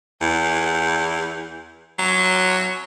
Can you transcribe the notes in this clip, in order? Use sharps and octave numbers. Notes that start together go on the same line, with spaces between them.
E2
F#3